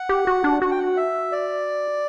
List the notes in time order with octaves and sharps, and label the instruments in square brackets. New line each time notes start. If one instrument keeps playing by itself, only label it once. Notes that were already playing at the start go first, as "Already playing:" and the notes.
Already playing: [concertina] F#5
[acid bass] G4
F#4
D4
[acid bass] F#4 [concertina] F#5
[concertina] G5
F#5
E5
D5